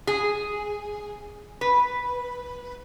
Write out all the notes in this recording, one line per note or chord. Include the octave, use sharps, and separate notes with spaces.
G#4
B4